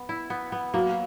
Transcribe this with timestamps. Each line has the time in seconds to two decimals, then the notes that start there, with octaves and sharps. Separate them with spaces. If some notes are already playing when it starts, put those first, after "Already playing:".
Already playing: B3
0.09 E4
0.30 B3
0.52 B3
0.74 F#3 A#3